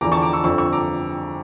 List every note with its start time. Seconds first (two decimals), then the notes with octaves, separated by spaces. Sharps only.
0.01 E2 D3 F3 A#5 D6
0.12 A5 C#6
0.22 A#5 D6
0.33 C#6 E6
0.44 G1 F2 D3 C#6 E6
0.58 C#6 E6
0.73 A#5 D6